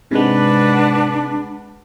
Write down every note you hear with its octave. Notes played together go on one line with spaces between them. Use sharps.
G#2 C3 G#3 D4 B4 F#5